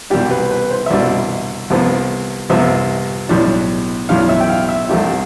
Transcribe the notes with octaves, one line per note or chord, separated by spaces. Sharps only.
C2 B2 G3 D4 G4
B4
B4
C5
E5
C2 B2 G3 D4 D5
C2 C3 F3 B3
C2 C3 F3 B3 E5
B1 A2 G3 D4
B1 A2 G3 D4 F5
E5
G5
F5
E5
C2 C3 F3 A3 D4 G4